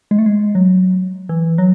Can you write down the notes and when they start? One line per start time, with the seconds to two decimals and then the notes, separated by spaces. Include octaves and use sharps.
0.11 G#3
0.19 A3
0.26 G#3
0.55 F#3
1.29 E3
1.58 F#3